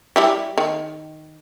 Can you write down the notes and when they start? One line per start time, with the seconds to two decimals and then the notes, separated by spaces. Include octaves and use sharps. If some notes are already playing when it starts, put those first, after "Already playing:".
0.16 G3 E4 G4
0.58 D#3